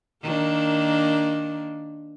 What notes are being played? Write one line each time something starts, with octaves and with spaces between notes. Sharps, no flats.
D#3 A#3 D4